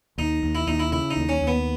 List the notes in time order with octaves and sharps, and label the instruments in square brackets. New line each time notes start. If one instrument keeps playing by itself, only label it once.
[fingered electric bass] D#2 [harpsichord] D#4
[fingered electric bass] D#2
[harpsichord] E4
[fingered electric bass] D#2 [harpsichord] D#4
[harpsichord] E4
[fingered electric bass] C#3 [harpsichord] E4
[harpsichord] D#4
[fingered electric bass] D#2
[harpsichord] C#4
[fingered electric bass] D#2
[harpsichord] B3